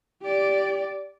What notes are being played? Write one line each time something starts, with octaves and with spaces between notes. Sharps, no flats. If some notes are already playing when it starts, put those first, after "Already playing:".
G4 D5